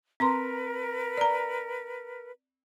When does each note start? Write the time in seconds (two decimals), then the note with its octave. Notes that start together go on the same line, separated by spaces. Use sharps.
0.20 C4 A#4 B4 A#5 C6
1.18 D5 A#5